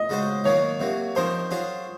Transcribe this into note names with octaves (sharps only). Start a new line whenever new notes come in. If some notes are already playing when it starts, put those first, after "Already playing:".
Already playing: D#5
C#3 G#3 C#4 F#4 C5
D#3 F#3 A#3 F4 C#5
C3 F#3 A#3
F3 C4 D#4 A#4 C5 C#5
F#3 C#4 F4 G#4 C#5